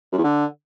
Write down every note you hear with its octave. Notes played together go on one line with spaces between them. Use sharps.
F#2
E2
D3